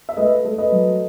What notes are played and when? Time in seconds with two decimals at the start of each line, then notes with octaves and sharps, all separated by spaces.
0.09 E5
0.17 A3 B4 D#5
0.45 A3
0.58 B4 D#5
0.72 F#3